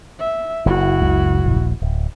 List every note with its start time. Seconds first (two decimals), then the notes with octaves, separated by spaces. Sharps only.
0.20 E5
0.66 F#1 E4 F#4
1.02 C#2
1.46 D#1 A#1
1.82 D1